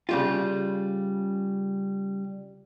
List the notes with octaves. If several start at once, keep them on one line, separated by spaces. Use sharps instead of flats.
C#3 G3 F4